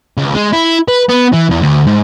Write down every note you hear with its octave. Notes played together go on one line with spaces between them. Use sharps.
C#2
G#3
E4
B4
B3
E3
E2
D2
G#2